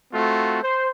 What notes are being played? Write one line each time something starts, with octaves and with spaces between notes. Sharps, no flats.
A3 C4 F4 F#4
C5